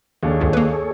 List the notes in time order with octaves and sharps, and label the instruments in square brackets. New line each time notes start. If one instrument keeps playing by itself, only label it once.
[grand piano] D#2 D4 [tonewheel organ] G#4 A4 C#5
[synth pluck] C#2 G2 D3
A#3 B4